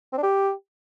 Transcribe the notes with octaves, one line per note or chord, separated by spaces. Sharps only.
C4
D4
G4